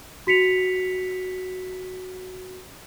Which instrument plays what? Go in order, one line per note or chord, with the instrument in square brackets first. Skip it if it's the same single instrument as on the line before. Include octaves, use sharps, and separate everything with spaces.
[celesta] F#4 B6 C#7 F7